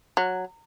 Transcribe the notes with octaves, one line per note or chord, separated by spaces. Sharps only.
F#3